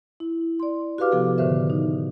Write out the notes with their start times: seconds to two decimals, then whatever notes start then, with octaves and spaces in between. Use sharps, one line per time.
0.20 E4
0.60 D5 C6
0.98 F#4 G4 B4 F5 D6 F6
1.12 C3 F3 B3 F#4 A4
1.38 A2 D3 D#3 A#4 C5 E5
1.70 D#4